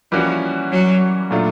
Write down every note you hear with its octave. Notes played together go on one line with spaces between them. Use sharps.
E3 F3 G3 A#3 C#4 F#4
F#3
A#2 F#3 A3 D4 F4